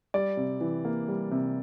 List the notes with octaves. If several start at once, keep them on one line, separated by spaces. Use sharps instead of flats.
G3 D5
C3
E3
A#3
G3
C3